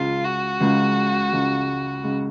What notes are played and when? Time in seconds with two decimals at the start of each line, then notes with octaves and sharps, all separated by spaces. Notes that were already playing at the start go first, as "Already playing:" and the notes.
Already playing: C#2 C#3 G#3 F4
0.24 F#4
0.60 C#2 C#3 G#3
1.33 C#2 C#3 G#3
2.04 C#3 G#3